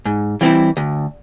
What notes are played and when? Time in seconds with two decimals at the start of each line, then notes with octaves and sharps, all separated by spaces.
0.05 G#2
0.41 E3 G3 C4 E4
0.77 D2